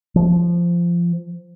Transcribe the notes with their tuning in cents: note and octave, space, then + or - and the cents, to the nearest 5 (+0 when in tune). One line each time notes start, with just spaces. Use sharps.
F3 -15